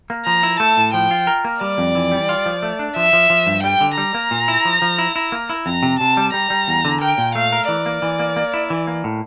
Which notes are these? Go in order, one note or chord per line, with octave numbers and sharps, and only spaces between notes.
A#3
F3 A#5
E4
A3 A5
A2
F3 G5
F4
A#4
A#3
G3 D5
F2
E3
G3
F4
F3
A3
D4
F3 E5
F3
F3
G2
G3 G5
D3
G3 A#5
A#3
A#2
E4
F3
F3
E4
E4
A#3
E4
F2 A#5
C3
C3 A5
G3
G3 A#5
G3
E2
D3
A#4 G5
A#2
A3 F5
A#4
E3 D5
A#3
E3
A#3
A#3
E4
E3
A#3
A2